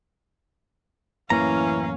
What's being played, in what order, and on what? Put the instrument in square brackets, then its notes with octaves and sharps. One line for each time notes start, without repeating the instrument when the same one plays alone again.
[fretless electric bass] A1 F#2 A#3 [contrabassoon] E3 [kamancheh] C#4 F5 [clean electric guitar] A#5